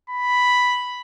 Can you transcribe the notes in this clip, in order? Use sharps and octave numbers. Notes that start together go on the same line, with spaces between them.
B5